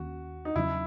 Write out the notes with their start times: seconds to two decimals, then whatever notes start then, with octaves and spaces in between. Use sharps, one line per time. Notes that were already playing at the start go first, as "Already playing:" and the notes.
Already playing: D#2 D#3 A#3 C#4 F#4
0.45 D#4
0.56 E2 C#3 F#3 C#4 E4